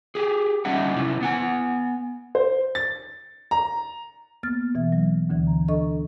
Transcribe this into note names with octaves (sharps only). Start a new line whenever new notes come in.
G4 G#4
D3 G3 C#4 D#4 E5 F#5
C3 C#4 E4
B3 F#5 G#5
C5
A6
A#5
A#3 B3 F6 A6
B2 E3 E5
F#3
D2 D3 E3
A#5
D4 A4 D#5 A#5 C#6